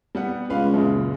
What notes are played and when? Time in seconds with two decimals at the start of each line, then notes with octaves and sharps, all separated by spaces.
0.15 G3 B3 F#5
0.50 C#2 B4 F5
0.74 F#2 A#2 C#3